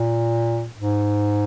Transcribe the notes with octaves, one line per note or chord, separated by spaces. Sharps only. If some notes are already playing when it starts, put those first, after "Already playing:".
Already playing: A#2
G#2